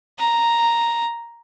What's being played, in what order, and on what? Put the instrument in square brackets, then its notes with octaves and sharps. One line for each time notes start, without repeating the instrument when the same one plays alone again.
[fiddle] A#5